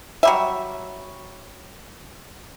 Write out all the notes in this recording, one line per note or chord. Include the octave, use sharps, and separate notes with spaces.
F#3 G3 E5